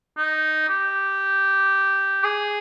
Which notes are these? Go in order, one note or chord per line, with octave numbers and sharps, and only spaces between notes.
D#4
G4
G#4